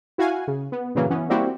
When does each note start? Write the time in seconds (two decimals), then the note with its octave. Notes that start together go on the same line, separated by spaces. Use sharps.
0.18 E4 F#4 F5 F#5 G#5
0.47 C#3
0.72 B3
0.95 G2 A#2 C#3 E3 F#3 A#3
1.10 E3 B3 C#4
1.29 G3 A#3 C4 E4 F#4 G4